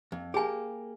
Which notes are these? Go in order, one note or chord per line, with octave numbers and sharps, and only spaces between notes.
F2
A#3 G4 G#4 G#5